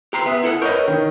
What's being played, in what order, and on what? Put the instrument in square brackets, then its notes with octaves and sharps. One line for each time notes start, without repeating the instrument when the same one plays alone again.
[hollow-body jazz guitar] G4 A#5 C6
[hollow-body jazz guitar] B3 [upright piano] E5 D#6 E6
[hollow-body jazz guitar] E4 A4 F#5
[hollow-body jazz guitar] A#4 C#5 D#5 [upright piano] B4 C#6 G6
[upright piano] D#3